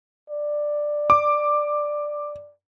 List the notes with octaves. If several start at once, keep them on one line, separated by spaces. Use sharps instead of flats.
D5
D6